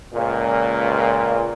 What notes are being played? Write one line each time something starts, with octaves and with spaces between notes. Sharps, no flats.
C#2 A#2